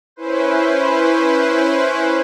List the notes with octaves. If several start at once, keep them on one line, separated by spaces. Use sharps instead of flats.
C#4 E4 B4 C5